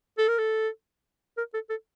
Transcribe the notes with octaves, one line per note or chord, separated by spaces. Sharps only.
A4
A#4
A4
A#4
A4
A4